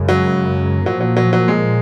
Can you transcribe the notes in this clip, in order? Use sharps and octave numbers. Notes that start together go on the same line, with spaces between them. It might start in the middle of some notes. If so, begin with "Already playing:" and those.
Already playing: F#2 C#3 G#3
F#3
A#2 F3 F#3 A#3
F#3
F#3
F#3
G#3